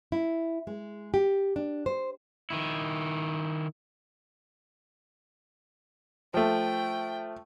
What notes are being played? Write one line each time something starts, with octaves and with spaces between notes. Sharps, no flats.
E4
G#3
G4
D4
C5
D#3 E4
F3 A3 G5